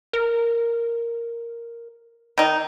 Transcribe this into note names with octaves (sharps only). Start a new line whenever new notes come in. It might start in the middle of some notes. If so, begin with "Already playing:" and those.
A#4
D#3 D#4